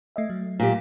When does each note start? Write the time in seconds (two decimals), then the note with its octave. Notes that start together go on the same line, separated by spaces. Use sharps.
0.16 A3 D#5 E5
0.30 F#3
0.60 A#2 G4